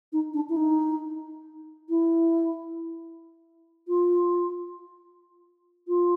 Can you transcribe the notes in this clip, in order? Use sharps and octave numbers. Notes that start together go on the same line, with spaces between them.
D#4
D4
E4
D#4
E4
F4
F4